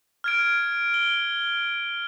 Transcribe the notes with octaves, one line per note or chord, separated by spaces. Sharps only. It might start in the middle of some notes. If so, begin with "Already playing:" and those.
F6 G#6 D7
G7